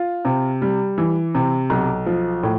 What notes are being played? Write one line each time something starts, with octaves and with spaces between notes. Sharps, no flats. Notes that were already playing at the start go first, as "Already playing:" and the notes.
Already playing: F4
C3
G3
E3
C3
B1
F3
A2